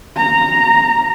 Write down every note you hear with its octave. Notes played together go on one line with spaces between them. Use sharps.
A#5